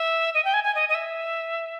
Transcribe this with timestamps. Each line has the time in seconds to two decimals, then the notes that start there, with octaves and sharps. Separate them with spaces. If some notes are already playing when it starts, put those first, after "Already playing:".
Already playing: E5
0.34 D#5
0.45 G5
0.54 G#5
0.64 G#5
0.75 D#5
0.89 D#5
0.95 E5